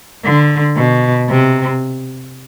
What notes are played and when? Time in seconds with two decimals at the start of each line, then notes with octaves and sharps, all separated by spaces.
0.24 D3
0.76 B2
1.29 C3